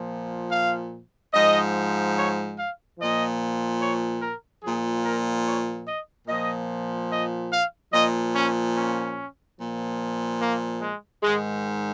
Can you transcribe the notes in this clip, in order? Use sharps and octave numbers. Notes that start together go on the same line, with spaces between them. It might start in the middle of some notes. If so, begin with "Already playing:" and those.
Already playing: A#2 F3
F5
G#2 F3 D#5
C#5
F5
A#2 F3 D#5
C#5
A#4
A#2 F3 G#4
A#4
C#5
D#5
A#2 F3 D#5
D#5
F5
A#2 F3 D#5
C#4
C#4
A#2 F3
A#3
G#3
G#2 D#3 G#3